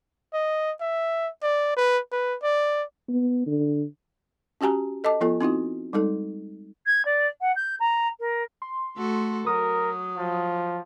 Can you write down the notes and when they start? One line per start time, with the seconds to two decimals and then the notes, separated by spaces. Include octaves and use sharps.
0.33 D#5
0.81 E5
1.43 D5
1.77 B4
2.12 B4
2.43 D5
3.08 B3
3.46 D3
4.61 C#4 F#4 G4 G#5 A#5
5.04 A4 D#5 A5 D6
5.21 F3 B3 F4 A4
5.41 C4 D#4 E4 F#4
5.93 G3 G#3 D#4 A4
6.86 G#6
7.05 D5
7.41 F#5
7.55 G6
7.80 A#5
8.19 A#4
8.62 C6
8.96 A3 F#4 A4
9.47 F#3 A#4 D#6
10.18 F3